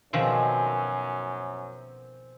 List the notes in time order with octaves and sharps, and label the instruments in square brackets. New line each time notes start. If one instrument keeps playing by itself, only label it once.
[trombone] F#2 [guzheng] B2 D#3 F3 [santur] C4 G#5 D6